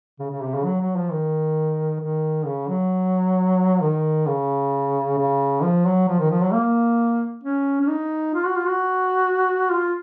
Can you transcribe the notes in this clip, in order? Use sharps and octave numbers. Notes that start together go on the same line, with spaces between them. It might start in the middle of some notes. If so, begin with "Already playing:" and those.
C#3
C#3
C3
C#3
F#3
F#3
F3
D#3
D#3
C#3
F#3
D#3
C#3
C#3
F3
F#3
F3
D#3
F3
F#3
A#3
C#4
C#4
D#4
F4
F#4
F4
F#4
F4